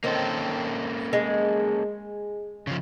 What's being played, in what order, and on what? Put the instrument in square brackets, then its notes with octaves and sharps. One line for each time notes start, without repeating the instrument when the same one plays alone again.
[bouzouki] D#3 C4 [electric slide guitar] A#3 C#4 A4
[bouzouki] G#3
[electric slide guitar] C#3 F3